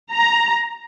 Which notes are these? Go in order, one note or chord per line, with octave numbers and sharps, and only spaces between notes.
A#5